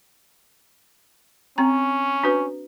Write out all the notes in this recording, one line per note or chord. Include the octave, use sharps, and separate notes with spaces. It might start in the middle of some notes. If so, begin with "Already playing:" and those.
C4 C#4 A#5
D4 F#4 B4